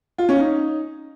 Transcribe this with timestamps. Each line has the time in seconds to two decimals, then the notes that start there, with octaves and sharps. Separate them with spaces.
0.18 F4
0.29 C#4
0.39 D#4